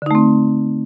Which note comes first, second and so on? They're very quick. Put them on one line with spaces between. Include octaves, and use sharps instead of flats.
D3 D#4 A3 C4